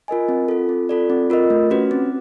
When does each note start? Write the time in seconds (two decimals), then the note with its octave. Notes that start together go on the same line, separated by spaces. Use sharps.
0.08 F4 A#4 D#5 G#5
0.29 C4
0.48 F4 A4
0.69 C4
0.89 F4 A4 D5
1.10 C4
1.30 F4 A#4 D#5
1.50 A3
1.70 C#4 F#4 B4
1.91 C4